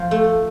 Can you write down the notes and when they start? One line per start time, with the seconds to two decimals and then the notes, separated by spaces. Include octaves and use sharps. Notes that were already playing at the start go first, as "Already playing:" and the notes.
Already playing: F3 F4
0.11 A3